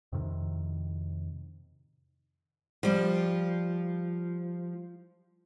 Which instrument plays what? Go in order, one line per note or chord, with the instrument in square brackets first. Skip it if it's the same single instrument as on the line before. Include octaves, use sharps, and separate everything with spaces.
[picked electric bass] F2 A2 C3 D#3
[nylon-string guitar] F3 G3